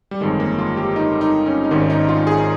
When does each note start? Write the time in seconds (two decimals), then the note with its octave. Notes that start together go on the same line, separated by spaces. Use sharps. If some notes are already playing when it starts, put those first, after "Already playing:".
0.11 G3
0.21 G1 F2 D#3 G#3
0.40 A#3
0.58 F4
0.77 G4
0.96 D#4
1.21 D#4
1.46 C#4
1.64 D#4
1.71 G#1 G#2 D#3 C#4
1.90 D#4
2.09 F4
2.27 G#4